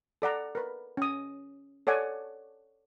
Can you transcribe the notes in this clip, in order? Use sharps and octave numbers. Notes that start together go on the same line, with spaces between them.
A4 D5 F#5 A#5
A#4 B4
C#4 D#6
A4 C#5 D5 F#5 G#5